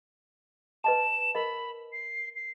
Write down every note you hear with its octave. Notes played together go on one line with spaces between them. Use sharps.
B4 D#5 A5 E7
A#4 D#5 B5
C7
C7